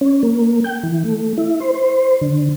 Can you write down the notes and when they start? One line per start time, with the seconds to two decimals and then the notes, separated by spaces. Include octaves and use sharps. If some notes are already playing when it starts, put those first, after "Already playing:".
0.01 C#4
0.23 A#3
0.64 G5
0.83 E3
1.05 A3
1.38 E4
1.60 C5
1.74 C5
2.21 D3